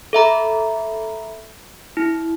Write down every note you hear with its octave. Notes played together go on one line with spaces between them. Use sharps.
A4 E5 A#5 B5
E4